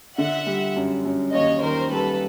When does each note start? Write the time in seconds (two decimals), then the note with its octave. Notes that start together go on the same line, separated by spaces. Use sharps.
0.18 D3 E5 F#5
0.47 G3
0.76 F#2
1.05 F#2
1.33 D#2 C#5 D#5
1.62 D#3 A#4 C5
1.91 G3 A4 B4